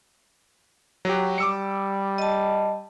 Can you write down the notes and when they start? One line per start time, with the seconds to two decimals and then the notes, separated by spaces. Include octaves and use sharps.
1.05 F#3 F#4 G4
1.38 G3 D6 E6 C#7
2.18 D#5 A5